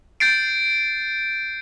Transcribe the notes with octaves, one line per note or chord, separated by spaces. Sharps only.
G6 A6 C7 D7